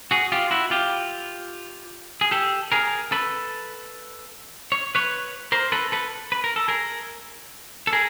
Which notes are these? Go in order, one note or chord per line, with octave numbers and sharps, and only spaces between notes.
F#4 G#4
F4 G4
E4 F#4
F4 G4
G#4
G4 A4
G#4 A#4
A4 B4
C#5
B4 C#5
A#4 C5
A4 B4
A4 B4
B4
A#4
A4
G#4 A#4
A4
G#4 A#4